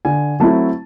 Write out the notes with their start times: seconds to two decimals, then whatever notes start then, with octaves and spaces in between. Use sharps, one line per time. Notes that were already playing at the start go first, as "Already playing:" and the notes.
0.05 D3 G#5
0.40 F#3 A3 C4 E4 A5